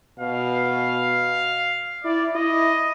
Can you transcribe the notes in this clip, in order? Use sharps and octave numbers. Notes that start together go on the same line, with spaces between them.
B2 F5
E4 D5
E4 D#5